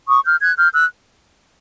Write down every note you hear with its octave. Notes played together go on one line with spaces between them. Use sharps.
C#6 D#6
F6 G6
F#6 G#6
F6 G6
E6 F#6